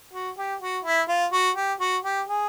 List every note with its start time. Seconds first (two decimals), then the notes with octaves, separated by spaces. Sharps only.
0.13 F#4
0.38 G4
0.61 F#4
0.85 E4
1.09 F4
1.33 F#4
1.56 G4
1.80 F#4
2.05 G4
2.28 G#4